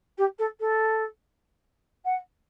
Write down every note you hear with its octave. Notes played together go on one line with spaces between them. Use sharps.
G4
A4
A4
F#5